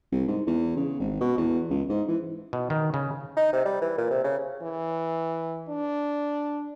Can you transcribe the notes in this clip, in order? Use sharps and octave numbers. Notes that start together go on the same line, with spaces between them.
C2
G#2
E2
C#3
G#1
B2
E2
C#2
G#2
E3
B2
D#3
C#3
D#4
C3
G3
E3
A#2
C3
C#3
E3
D4